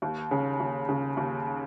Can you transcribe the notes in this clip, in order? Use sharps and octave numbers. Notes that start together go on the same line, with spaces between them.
D#2
C#3
D#2
C#3
D#2